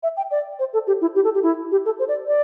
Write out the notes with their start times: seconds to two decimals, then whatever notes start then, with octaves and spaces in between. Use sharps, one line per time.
0.03 E5
0.17 G5
0.31 D5
0.59 C5
0.73 A4
0.87 G4
1.01 E4
1.15 G4
1.24 A4
1.34 G4
1.43 E4
1.71 G4
1.85 A4
1.99 C5
2.08 D5
2.27 D5